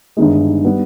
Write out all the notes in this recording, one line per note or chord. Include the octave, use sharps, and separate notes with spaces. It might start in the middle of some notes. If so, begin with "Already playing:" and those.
G1 G2 D#3 G#3
G3 B3